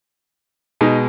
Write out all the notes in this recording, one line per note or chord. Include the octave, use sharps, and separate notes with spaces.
B2 G#3 D#4